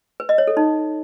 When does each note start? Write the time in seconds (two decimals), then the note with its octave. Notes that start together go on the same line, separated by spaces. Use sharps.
0.20 B4
0.29 D#5
0.38 C#5
0.47 A4
0.57 D#4